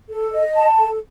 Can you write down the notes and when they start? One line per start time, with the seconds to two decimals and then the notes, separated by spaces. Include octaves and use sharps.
0.10 A4
0.32 D#5
0.55 A5
0.79 A4